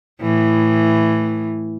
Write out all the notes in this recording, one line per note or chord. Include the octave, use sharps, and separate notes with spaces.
A2 E3